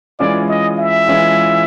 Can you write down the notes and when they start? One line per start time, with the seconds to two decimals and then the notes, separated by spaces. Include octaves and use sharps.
0.19 E3 G#3 C#4 F4 D5
0.49 D#5
0.78 E5
1.07 E3 G#3 C#4 F4